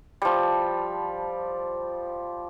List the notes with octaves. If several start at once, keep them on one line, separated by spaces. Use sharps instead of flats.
F3 G3